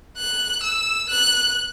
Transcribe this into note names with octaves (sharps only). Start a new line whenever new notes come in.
F#6
E6
F#6